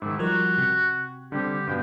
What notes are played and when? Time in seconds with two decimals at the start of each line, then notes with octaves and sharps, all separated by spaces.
0.02 G#2 D#3 E4
0.19 F3 G3 F#4 A#4 G#6
0.58 C3
1.32 D3 G3 C4 G4
1.67 G2 B2 G5